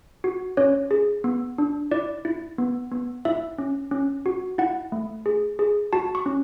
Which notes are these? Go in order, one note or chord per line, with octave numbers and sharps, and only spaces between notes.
F#4
C#4 C#5
G#4
B3
D4
E4 D5
E4
B3
B3
E4 E5
C#4
C#4
F#4
E4 F#5
A3
G#4
G#4
F#4 A5
C#6
C#4